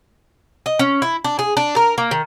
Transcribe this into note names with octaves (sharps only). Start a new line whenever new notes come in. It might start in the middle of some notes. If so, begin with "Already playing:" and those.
D#5
C#4
E4
D4
G#4
D4
A#4
A#3
D#3